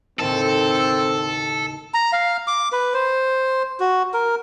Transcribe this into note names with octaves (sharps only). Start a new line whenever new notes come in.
D#2 A2 C#3 C4 A4
A#5
F5
D6
B4
C5
F#4
A#4